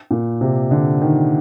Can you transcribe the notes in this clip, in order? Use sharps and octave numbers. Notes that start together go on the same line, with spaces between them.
A#2
C3
D3
D#3